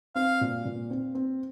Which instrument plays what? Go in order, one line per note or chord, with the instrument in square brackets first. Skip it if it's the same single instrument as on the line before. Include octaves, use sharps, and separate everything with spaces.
[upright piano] C4 [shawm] F5
[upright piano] A#2
A#2
C4
C4